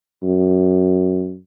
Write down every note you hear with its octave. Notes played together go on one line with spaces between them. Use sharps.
F#2